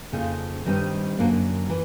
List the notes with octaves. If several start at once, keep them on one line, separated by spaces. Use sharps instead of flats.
F2 C#3 F3 A#3 D#4
G2 D#3 G3 C4 D#4
F#2 D3 F#3 A#3 D4
E3